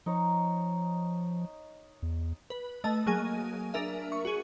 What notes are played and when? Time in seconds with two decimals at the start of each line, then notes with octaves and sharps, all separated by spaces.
0.06 F3 D#4 C#5
2.02 E2
2.50 B4
2.84 A3 D#5 A5
3.06 F#3 A#3 G#4 G#5 D#7
3.74 D4 A#4 E5
4.12 C#6
4.25 F#4 G#4